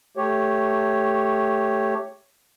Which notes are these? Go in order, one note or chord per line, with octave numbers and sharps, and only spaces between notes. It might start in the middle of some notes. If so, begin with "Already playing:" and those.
A3 G4 C#5